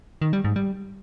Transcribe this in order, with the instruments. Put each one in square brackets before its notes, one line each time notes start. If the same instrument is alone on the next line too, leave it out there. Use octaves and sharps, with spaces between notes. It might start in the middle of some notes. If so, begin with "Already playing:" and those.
[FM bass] D#3
G3
G#2
G3